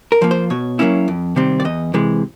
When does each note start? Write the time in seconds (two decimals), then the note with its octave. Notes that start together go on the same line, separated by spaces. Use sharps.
0.12 A#4
0.22 F3 A#3
0.31 C5
0.50 B2 C#5
0.79 F#3 A#3 C#4 E4
1.08 F2
1.36 C3 D#3 G3 C4
1.60 D5
1.65 E2 D#5
1.94 C3 E3 G#3